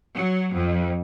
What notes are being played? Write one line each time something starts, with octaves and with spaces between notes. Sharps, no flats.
F#3
F2